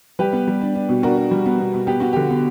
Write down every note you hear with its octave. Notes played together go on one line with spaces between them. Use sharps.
G3 G4 B4
B3
G3
D4
D4
B2
D4 F#4 A#4
D4
G3
B3
B2
B2
B3 G4
B3 F#4
D3 G4
B3